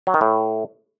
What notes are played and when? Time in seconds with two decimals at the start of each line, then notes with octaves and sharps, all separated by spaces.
0.07 F#3
0.14 D#3
0.21 A2